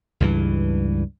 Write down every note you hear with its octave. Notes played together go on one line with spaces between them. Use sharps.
C#2 G2 E3